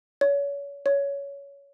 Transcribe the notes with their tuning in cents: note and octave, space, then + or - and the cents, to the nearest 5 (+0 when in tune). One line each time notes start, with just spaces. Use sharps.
C#5 +30
C#5 +15